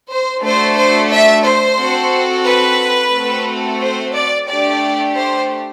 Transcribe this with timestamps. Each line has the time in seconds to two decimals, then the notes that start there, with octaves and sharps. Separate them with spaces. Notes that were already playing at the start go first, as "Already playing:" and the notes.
0.09 C5
0.42 A3 D4 F#4 A4 C5
0.76 C5
1.11 E5
1.45 C5
1.78 C4 F#4 A4
2.46 B4
3.13 A3 C4 F#4 A4
3.81 C5
4.14 D5
4.49 A3 D4 G4 D5
5.16 C5